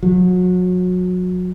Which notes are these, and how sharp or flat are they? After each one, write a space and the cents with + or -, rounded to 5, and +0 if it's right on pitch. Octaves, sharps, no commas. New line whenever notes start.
F#3 -30